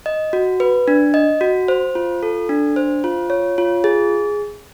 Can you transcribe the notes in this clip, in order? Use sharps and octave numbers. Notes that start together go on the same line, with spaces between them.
D#5
F#4
B4
D4
D#5
F#4
C5
F4
A4
D4
C5
F4
C#5
F4
G#4